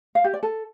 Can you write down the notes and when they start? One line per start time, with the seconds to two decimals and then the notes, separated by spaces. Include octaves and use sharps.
0.15 F5
0.24 G4
0.33 D5
0.43 A4